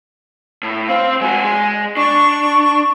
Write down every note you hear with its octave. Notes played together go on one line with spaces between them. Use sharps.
A2
C4 C5 F5
G#3 F#4 G#5
G#3
D4 C#6